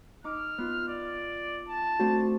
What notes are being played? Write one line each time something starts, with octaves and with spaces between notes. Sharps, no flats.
D#4 D6 F6
B3 F4
D5
A5
A3 C4 D4 F#4